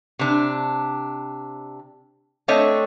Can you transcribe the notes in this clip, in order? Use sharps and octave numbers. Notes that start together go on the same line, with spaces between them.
C3 D4
A3 C4 D4 C#5 D#5